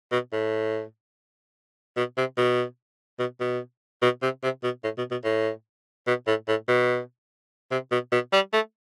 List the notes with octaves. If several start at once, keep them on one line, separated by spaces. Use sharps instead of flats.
B2
A2
B2
C3
B2
B2
B2
B2
C3
C3
B2
A2
B2
B2
A2
B2
A2
A2
B2
C3
B2
B2
G3
A3